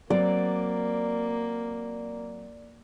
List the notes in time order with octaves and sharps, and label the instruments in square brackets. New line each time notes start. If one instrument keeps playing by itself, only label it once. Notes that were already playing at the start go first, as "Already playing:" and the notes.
[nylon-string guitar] F#3 C4 [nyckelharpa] A#3 [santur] D5